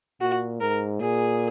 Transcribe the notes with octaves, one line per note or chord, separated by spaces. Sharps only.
A#2 F#4
G#2 A#4
A#2 G#4